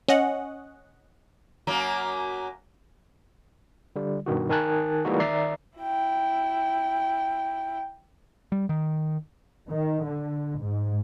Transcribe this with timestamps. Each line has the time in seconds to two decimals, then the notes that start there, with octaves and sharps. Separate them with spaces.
0.08 C#4 D#5 F#5
1.67 F#2 F#3 A#3
3.96 D3 G3
4.26 G2 B2 D#3 F#4
4.50 D#3 A#4 G#5 A5 F#6
5.05 E3 G3 G#3 A#3 D#4 F#4
5.20 D#3 D5 E5 A#5 C7
5.78 E4 G5
8.52 G3
8.69 D#3
9.69 D#3
10.07 D3
10.62 G#2